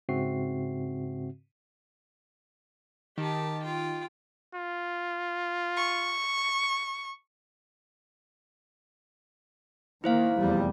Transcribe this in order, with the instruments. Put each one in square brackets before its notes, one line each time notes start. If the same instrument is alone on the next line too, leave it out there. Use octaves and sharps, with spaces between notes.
[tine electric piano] G#2 C#3 C4 F#4 E5 C7
[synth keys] D#3 [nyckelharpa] G4 A5
[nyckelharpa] F4 G5
[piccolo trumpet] F4
[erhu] C#6
[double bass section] D#3 A#3 [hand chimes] E4 C5 F5
[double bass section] F1 E2 G3